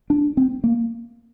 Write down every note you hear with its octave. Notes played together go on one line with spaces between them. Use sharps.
D4
C4
A#3